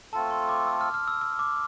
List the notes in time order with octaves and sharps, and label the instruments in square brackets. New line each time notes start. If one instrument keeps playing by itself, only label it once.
[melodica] A3 C4 F4 A4 [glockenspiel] A5
[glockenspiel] C6
D6
E6
F6
F6
E6
E6
D6